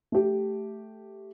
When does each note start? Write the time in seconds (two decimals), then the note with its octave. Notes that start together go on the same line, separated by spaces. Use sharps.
0.12 A3 G4